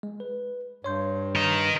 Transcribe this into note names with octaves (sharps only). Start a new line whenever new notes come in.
G#3
B4
G2 C#5 C6 G6
A#4 D#5